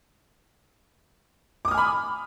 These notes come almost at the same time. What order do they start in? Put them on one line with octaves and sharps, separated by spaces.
D6 D#6 F6 G#5 B5